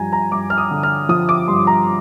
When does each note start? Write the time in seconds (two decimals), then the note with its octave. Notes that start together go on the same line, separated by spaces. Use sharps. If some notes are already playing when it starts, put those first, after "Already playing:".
Already playing: G2 F3 G#5 A#5
0.13 A#5
0.32 G2 D6
0.50 F6
0.58 D#6
0.71 D3
0.83 F6
1.09 F3 D#6
1.29 D6
1.48 G2 C6
1.67 A#5